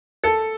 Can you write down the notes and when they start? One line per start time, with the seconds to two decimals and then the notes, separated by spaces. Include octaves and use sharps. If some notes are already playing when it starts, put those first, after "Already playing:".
0.24 A4